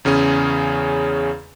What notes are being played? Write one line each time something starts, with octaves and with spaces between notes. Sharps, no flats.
E2 C#3 C#4 G#4